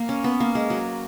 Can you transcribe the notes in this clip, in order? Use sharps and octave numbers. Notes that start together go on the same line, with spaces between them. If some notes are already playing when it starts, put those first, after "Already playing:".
Already playing: A#3
C#4
B3
A#3
G#3
F#3